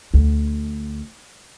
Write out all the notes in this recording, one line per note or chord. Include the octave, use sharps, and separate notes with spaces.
D2 D3